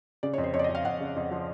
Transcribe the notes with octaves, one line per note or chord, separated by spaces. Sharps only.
C#3 D5
C#5
F2
C5
F2 C#5
D5
D#5
F2
F5
F2 F#5
C#3
F2
F3